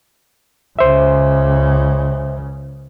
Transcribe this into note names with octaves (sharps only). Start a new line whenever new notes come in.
C#2 C#3 C5 E5